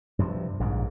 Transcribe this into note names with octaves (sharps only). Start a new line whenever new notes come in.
G2 C3 F3
A#1 G#2 C3